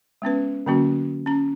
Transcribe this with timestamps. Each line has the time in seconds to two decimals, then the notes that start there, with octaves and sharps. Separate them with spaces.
0.22 G#3 B3 C#4 B4
0.66 D3 F#3 A#3 C#4 F#4
1.26 C#4 A#5